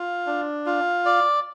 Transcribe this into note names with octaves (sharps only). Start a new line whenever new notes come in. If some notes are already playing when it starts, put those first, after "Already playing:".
Already playing: F4
D4
F4
D5